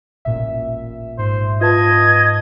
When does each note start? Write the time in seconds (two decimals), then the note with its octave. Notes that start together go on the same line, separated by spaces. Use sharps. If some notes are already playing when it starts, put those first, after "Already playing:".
0.25 E1 A1 A#2 E5
1.18 G#2 C5
1.61 F4 B4 D#5 A5 G#6